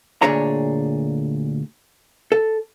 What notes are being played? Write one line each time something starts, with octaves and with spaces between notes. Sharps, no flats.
D2 A#2 D4 G#4 C#5 A#5
A4